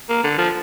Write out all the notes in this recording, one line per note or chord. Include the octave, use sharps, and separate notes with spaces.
A#3
D3
F3